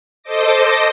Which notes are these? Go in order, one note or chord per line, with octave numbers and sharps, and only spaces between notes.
A4 C5 D#5 D6 A#6